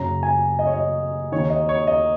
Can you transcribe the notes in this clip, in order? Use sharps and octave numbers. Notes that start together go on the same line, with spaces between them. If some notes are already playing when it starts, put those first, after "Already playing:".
Already playing: F#1 F#2 C#3 A#5
G#5
D#5
C#5
D#5
D#2 D#3 C#5
D#5
C#5
D#5